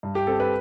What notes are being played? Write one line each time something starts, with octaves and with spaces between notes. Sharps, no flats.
G2
G4
C4 A4
B4